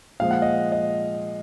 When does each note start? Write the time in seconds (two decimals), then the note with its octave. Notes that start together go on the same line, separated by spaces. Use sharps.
0.20 A#2 F3 G#3 F5
0.31 F#5
0.42 D#5
0.72 D#5